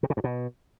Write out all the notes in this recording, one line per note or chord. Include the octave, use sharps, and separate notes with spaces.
C3
C#3
G2
B2